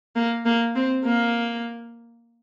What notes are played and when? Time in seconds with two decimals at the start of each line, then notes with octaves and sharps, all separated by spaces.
0.16 A#3
0.45 A#3
0.75 C4
1.05 A#3